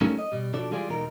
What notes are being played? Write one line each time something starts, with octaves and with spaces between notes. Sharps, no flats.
F#3 G3 A3 A#3 C#4 D#4
D#5
B2 G3
B2 F3 D4 F#4 A4 D5
E3 G3 G#3 F4 G#4 D5
E2 B2 G#3 D#4 A#4